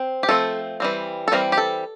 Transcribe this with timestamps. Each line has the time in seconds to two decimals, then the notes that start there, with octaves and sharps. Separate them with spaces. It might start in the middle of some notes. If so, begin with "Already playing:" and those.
Already playing: C4
0.23 G4
0.29 F3 A3 C4 A4
0.80 E3 G3 C4
1.28 A4
1.32 E3 G3 C4 A#4
1.52 G4
1.58 A4